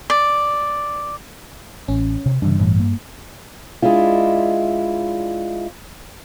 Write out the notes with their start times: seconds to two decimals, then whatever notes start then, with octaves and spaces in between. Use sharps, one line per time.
0.10 D5
1.88 A1 C#4
2.26 C3
2.42 G2 C#3 E3 D4
2.59 A1 A2 E3
2.80 A#3
3.82 G#3 D4 E4 F4